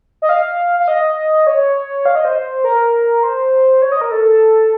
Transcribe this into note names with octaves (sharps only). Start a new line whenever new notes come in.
D#5
F5
F5
D#5
C#5
F5
D#5
C5
A#4
C5
C#5
D#5
A#4
A4